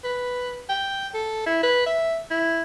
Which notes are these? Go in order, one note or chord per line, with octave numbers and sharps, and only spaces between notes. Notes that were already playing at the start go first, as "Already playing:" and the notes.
B4
G5
A4
E4
B4
E5
E4